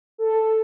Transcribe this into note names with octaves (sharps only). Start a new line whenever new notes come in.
A4